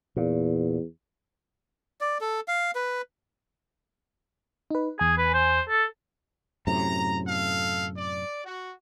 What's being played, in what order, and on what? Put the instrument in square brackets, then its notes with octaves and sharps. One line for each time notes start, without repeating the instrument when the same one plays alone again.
[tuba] E2 [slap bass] A#2
[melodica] D5
A4
F5
B4
[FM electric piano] D#4 B4
[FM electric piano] E2 G#5 [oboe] G#4
[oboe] B4
C5
A4
[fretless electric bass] F#2 A2 C3 [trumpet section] A#5
[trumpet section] A4 F5
D5
F#4